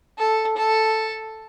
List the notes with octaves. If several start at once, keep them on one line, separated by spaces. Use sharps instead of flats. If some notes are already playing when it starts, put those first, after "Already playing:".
A4
A4